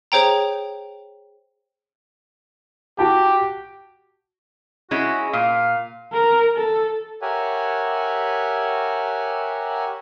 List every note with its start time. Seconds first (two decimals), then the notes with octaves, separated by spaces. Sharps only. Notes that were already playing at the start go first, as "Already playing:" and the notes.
0.12 G#4 C5 C#5 G5 A#5
2.99 F#4 G4 A5
4.91 G#3 C#4 E4 F#4
5.33 A#2 F5
6.13 A#4
6.57 A4
7.22 G4 A#4 C#5 E5 F#5 G#5